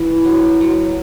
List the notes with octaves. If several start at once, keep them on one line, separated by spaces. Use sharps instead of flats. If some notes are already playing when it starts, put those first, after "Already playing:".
Already playing: E3 E4
F#3
F#3